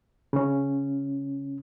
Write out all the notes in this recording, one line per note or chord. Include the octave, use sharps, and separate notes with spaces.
C#3 C#4